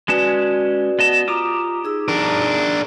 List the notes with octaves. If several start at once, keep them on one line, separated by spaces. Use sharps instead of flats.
G#3 C#4 F#4 B4 D5 A5
B3 D#5 A5
F4 G4 A#5 D6 D#6
D#4 G#4 E6
D4 A#4